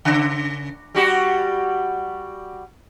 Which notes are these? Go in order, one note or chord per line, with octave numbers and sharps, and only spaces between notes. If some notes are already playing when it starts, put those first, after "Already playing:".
C#3
G3 F#4 G4